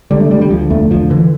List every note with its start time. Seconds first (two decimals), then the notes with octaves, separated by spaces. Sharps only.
0.11 D3 G3
0.21 A3
0.31 D3 G3
0.41 G3
0.50 D2 F3
0.70 E1 A3
0.91 D2 F3
1.10 D3 E3